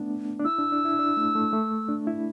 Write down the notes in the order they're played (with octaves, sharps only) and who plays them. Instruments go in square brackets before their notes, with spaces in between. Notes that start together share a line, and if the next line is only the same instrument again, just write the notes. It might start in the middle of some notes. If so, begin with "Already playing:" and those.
Already playing: [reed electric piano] A3 B3 D4
D4
[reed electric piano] E4 [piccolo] E6
[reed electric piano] D4
D4
E4
D4
A3
A3
A3
D4
E4